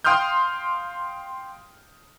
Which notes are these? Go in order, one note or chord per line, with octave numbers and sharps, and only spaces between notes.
F5 G5 C6 D#6 F6 G6